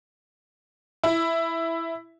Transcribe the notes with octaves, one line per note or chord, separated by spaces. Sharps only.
E4